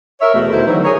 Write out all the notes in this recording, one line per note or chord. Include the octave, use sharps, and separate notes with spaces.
A#4 C#5 E5
E2 B2 A3
D#3 A3 E4 B4 C5
D3 E3 F#3 A3 D#4
G#4 A#4 C#5